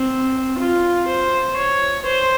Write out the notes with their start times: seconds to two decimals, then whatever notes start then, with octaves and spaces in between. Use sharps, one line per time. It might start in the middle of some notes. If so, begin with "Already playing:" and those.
Already playing: C4
0.59 F4
1.08 C5
1.56 C#5
2.05 C5